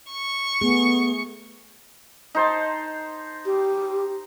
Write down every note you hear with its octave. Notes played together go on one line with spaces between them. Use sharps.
C#6
A3 B3 G#4
D#4 C5 A5
G4